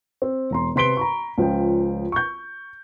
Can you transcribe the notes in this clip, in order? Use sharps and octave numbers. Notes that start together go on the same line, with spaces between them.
C4
E1 A#5 C6
C3 B4 C6 B6 D7 G7
A#5 B5 C#6
C#2 F3 C#4 G5
C#6 G6